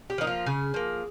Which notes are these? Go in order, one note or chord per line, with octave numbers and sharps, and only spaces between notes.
G4
F3 A#3 D#4
F4
C#3 G#4
F3 A#3